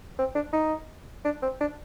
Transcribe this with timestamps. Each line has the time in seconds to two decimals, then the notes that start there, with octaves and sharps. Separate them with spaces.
0.18 C4
0.35 D4
0.53 D#4
1.25 D4
1.42 C4
1.60 D4